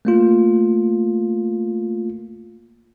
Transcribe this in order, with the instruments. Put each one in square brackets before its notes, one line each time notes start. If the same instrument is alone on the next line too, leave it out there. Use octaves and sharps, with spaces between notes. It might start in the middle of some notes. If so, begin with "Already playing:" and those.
[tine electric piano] A3 A#3 F4